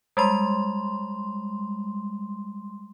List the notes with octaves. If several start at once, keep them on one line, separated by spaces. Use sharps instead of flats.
G3 G#3 C6